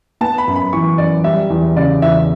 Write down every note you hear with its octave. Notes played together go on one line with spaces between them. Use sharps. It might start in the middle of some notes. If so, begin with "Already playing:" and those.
B3 A5
B5
F#2
B5
E3 C#6
F#2 D5
G3 E5
E2
C#3 D5
E2 E5